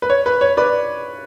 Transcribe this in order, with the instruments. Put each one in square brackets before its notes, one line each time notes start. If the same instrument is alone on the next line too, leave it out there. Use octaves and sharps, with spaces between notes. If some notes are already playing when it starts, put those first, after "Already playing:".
[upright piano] B4
C#5
B4
C#5
B4 D5